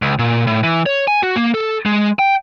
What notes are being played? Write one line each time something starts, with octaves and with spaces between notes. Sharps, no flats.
C#2
A#2
A2
E3
C#5
G#5
F#4
A#3
A4
G#3
G5